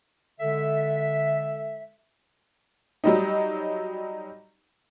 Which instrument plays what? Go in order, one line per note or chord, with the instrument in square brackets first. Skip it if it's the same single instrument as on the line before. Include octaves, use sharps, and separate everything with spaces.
[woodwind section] D3 G#3 A4 E5
[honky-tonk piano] F#3 G3 D#4